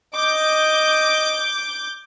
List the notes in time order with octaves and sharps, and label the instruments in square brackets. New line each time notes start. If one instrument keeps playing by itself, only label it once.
[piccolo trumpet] D#5 [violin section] D6 G6